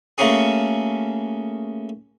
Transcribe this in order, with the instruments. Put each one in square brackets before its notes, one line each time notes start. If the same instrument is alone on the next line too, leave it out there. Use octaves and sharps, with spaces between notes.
[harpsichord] C#3 A3 A#3 C#4 F#4 G#4